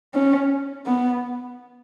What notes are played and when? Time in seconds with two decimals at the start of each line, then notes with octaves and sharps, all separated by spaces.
0.14 C#4
0.86 B3